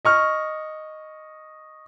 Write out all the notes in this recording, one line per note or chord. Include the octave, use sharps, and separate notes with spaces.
D#5 C#6 F6